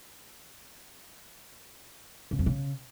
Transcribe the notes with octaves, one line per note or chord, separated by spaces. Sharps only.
C#3
F2
C#3